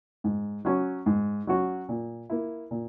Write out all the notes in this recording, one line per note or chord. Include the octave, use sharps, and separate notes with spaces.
G#2
F#3 C#4 F#4
G#2
F#3 C#4 F#4
A#2
A#3 E4
A#2